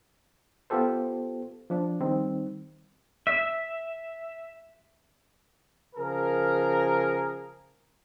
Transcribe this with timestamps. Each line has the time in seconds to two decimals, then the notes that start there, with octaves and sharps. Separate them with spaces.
0.70 B3 F4 G4 A4 C5
1.70 F3 D4
2.00 D#3 G3 C4 D#4
3.27 E5
5.96 C#3 F3 G#4 A#4